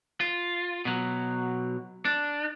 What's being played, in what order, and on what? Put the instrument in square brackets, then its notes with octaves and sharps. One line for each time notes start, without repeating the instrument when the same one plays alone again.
[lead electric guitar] F4
B2 F#3
D4